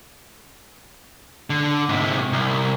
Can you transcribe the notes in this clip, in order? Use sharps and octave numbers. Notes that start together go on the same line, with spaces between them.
D3
G#2 C3
C2